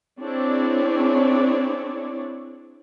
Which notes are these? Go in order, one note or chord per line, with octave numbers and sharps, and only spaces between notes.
C4 D4 E4 G#4 C#5 D5